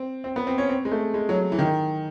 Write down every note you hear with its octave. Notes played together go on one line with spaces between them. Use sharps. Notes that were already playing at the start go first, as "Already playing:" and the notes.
Already playing: C4
C4
B3
C4
C#4
C4
G#3
A3
G#3
F#3
E3
D#3